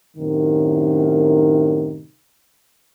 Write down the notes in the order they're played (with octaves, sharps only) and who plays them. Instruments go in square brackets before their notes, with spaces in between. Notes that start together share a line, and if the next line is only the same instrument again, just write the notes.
[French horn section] F#2 A2 C3 D#3